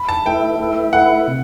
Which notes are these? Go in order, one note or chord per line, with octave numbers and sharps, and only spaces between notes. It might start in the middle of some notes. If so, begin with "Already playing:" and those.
Already playing: B5
A5
A3 E4 B4 E5 G5
A3 E4 B4 E5
A3 E4 B4 E5 F#5
C3